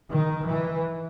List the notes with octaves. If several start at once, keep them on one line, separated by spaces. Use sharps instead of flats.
D#3
E3